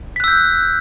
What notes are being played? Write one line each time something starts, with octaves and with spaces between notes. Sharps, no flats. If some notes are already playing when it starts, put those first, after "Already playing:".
E6 F#6 G6 B6